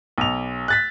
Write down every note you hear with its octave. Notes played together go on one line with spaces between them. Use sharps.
B1 F7
F#6 A6 B6